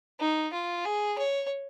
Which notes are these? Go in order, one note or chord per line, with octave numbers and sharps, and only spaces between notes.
D#4
F4
G#4
C#5